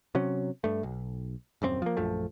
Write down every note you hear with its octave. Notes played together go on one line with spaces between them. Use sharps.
C3 F#3 C#4
G2 A3
B1
D#1 F#2 G#3 C4
F3 A#3
A#1 F#2 F3 A3